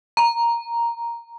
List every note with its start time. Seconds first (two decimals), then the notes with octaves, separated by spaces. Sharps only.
0.17 A#5